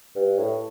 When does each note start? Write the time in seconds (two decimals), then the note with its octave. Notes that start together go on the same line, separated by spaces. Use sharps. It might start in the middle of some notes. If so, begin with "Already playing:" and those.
0.16 G2
0.38 A2